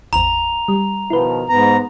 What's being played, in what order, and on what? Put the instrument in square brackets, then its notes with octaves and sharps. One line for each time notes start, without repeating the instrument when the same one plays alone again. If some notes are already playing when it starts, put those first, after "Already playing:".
[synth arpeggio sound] G#1 E2 [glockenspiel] A#5 F7
[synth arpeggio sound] G3
[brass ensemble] B2 D#3 F3 [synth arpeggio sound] E4 B4
[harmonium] G#2 A#5 [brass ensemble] B3